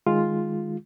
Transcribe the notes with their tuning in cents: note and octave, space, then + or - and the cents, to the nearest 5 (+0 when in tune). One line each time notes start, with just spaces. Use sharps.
D#3 +0 G#3 +0 F4 +0